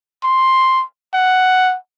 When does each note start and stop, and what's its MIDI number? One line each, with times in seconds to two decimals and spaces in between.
0.24 0.83 84
1.14 1.76 78